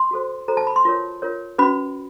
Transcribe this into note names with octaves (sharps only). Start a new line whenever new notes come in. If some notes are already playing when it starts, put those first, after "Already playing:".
Already playing: C6
F#4 A4 C5
F#4 A4 C5 A#5
A5
B5
C6
F4 A#4 C#5
F4 A#4 C#5
C#4 F#4 B4 B5